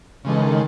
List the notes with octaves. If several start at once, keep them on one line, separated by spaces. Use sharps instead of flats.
C#3 E3 G#3 D#4 A4
D#3